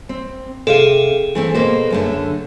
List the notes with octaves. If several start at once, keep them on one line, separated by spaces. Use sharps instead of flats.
C4
C3 G#4 A4 F5
E3 A3 C4
B2 A#3 C5
F#2 D3 A3